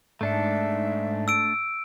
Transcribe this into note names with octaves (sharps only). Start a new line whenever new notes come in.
G#2 A3 D4 A4 E5
E6 D7